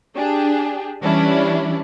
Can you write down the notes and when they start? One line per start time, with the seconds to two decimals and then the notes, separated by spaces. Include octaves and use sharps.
0.15 D4 G4 G#4
1.02 E3 G3 C#4 D4 E4